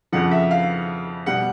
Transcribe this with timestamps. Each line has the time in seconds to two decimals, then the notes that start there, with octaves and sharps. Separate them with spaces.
0.12 F2 C#3 F3 F#5
0.31 E5
0.51 F5
1.26 B2 G3 F#5